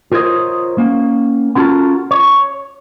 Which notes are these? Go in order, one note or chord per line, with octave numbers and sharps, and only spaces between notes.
F4 A#4 C5 C#5 D#5
A#3 C#4
B3 C#4 F4 F#4 A4 A#4
C#5